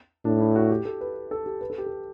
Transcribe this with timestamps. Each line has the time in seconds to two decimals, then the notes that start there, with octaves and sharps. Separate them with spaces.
0.25 A2 D4
0.41 E4
0.56 F#4
0.70 G4
0.85 A4
1.01 B4
1.31 A4
1.46 G4
1.61 B4
1.70 A4
1.78 G4
1.86 A4